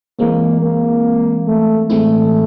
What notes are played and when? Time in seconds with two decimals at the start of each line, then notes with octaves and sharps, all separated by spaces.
0.19 E3 G#3 A#3 C4
0.62 A#3
1.47 A3
1.90 A2 E3 G#3 A3 C4 E4